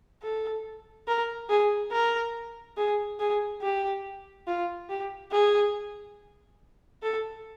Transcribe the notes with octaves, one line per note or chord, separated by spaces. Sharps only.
A4
A#4
G#4
A#4
G#4
G#4
G4
F4
G4
G#4
A4